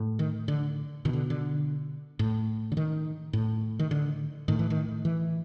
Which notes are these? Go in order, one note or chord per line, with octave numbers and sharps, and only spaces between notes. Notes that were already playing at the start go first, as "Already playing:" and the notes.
Already playing: A2
D#3
D3
B2 D#3
D3
D3
A2
D3
D#3
A2
D#3
D3
A2 D#3
E3
D#3
E3